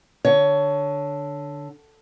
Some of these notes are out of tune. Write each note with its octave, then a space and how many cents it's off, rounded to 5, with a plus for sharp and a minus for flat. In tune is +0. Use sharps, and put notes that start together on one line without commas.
D3 +0 C#5 +20